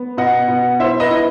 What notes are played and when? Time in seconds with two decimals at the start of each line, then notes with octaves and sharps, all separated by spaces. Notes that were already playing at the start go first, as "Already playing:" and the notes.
Already playing: B3
0.17 B2 D#5 F#5
0.48 B2
0.79 E4 C5 E5
1.00 B4 D#5
1.10 E4